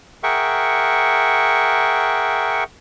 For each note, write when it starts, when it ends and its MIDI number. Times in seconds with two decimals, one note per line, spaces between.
0.23 2.64 68
0.23 2.64 70
0.23 2.64 76
0.23 2.64 78
0.23 2.64 79
0.23 2.64 85